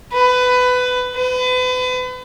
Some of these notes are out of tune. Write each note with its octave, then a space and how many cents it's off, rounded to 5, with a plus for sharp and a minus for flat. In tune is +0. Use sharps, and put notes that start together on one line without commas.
B4 +20
B4 +35